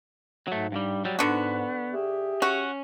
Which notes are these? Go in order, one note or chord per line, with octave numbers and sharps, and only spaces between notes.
G#2 F#3 A3
G2 G3
F#3 G3
G#2 D3 B3 F#4
G4 G#4 E5
C#4 F#4